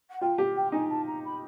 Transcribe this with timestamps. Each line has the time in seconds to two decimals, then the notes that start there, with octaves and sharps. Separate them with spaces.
0.10 F#5
0.21 F4 G5
0.38 G4
0.55 G5
0.72 D#4 G#5
0.89 A5
1.07 A#5
1.24 B5